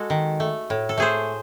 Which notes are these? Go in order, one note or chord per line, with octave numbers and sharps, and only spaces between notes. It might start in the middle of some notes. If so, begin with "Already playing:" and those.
Already playing: G#3 F#4 A4
D#3
A3
A2
A4
A3 G#4 C5